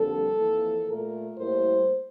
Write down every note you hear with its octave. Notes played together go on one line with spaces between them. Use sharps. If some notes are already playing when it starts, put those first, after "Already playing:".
Already playing: F2 D3 G3 A#3 A4
F2 E3 A#3
A#2 A3 A#4
A2 G3 A#3 C5